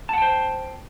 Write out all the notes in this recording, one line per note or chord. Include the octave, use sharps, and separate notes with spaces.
C5 F#5 G5 A5